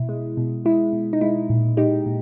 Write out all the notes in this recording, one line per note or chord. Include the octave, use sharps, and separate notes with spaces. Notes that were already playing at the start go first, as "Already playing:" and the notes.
Already playing: B2 E4
G#3
B2
G#3 E4
B2
D#4
G#3 E4
A#2
G#3 D#4 G4
A#2